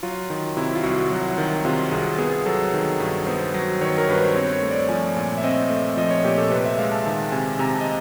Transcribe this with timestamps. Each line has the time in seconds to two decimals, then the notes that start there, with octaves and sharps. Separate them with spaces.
0.03 F#3 F4
0.30 D#3
0.57 C3 E4
0.75 F4
0.83 C2 F#4
1.11 F#3
1.38 D#3
1.65 C3 F4
1.92 C2 G#4
2.18 B3 G#4
2.46 F#3 A4
2.74 D#3
3.00 G2
3.27 B3 C5
3.54 F#3
3.81 D#3 C#5
3.98 A#4
4.09 G2 B4
4.23 C5
4.35 C4 C#5
4.53 C#5
4.63 A3
4.71 D5
4.89 F3 G#5
5.16 A#2
5.38 E5
5.44 C4 D#5
5.70 A3
5.97 F3 D#5
6.10 C#5
6.24 A#2 G4
6.38 A4
6.51 C3 B4
6.65 E5
6.78 G#3 F5
6.92 A5
7.06 D#3 A5
7.32 C3 G#5
7.59 C3 A#5
7.73 A5
7.81 D#5